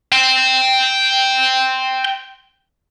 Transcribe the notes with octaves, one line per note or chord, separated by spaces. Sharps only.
G5 C6